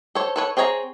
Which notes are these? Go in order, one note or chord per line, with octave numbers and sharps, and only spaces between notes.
A4 C5 C#5
A4 B4 C#5
C4 G#4 C#5 E5 A#5